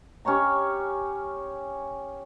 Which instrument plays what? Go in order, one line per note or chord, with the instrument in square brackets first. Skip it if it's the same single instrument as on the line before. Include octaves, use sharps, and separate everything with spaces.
[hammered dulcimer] C#4 G4 C#5 A#5